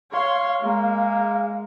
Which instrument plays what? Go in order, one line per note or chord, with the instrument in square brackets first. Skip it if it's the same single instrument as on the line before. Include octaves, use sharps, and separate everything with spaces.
[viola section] C#5 C6 [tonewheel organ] F5
[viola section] G#3 A#3